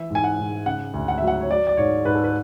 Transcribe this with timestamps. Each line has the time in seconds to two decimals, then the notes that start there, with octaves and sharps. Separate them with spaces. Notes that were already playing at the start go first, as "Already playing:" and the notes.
Already playing: E3 E5
0.10 G#2 G#5
0.24 F#5
0.38 G#2
0.66 C#3 F#5
0.94 D2
1.08 F#5
1.18 F#3 E5
1.28 F#5
1.41 C#5
1.50 F#3 D5
1.67 D5
1.77 G#2 C#5
2.05 G#2 B4
2.15 A4
2.24 B4